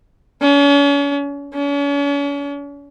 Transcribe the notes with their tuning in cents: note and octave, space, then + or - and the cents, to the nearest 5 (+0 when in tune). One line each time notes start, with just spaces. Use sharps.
C#4 +40
C#4 +40